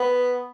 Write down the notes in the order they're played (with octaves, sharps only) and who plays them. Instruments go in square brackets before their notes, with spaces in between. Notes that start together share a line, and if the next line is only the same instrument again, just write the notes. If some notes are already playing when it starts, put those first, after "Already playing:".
Already playing: [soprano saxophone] B3